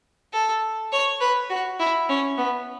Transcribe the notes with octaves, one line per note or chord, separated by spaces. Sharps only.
A4
C#5
B4
F#4
E4
C#4
B3